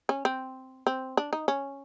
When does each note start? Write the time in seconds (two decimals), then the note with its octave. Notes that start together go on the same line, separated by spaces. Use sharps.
0.09 C#4
0.25 C4
0.87 C4
1.17 D4
1.33 D#4
1.48 C#4